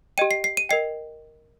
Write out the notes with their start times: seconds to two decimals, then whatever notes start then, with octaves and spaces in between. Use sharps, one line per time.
0.18 G4 D#5 G5 D#7
0.31 C7
0.44 C7
0.57 D#7
0.69 A#4 D#5 G5 C7